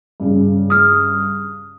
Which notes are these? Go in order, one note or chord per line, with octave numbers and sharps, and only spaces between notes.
G2 C#3
D#6 F6